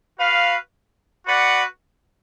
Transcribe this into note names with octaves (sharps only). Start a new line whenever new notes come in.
F#4 B4 F5
F#4 B4 D5 F#5